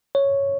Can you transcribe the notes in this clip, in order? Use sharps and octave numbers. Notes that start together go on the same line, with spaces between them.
C#5